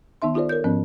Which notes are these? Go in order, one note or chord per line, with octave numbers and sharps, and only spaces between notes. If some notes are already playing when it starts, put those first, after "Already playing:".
D#3 B3 D#4 E5 C6
D#4 F4 G4 A4 C5 D5
A4 A#4 C#5 G6
G#2 F3 B3 C#4